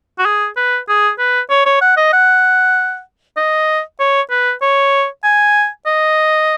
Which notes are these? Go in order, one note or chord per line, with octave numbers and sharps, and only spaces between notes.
F#4
G#4
B4
G#4
B4
C#5
C#5
F#5
D#5
F#5
D#5
C#5
B4
C#5
G#5
D#5